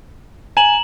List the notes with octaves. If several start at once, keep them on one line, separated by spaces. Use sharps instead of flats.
G#5 A#5 E7 F#7